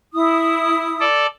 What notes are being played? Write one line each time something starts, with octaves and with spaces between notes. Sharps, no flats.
E4 D#6
A4 D5